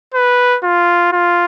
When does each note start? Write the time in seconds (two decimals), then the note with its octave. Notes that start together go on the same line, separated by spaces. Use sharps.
0.14 B4
0.64 F4
1.13 F4